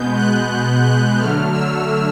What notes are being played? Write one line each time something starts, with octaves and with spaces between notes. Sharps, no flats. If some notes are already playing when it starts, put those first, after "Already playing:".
Already playing: B2 G#3 B3 G6
F#6
F#6
D3 F#3 A3 F6
E6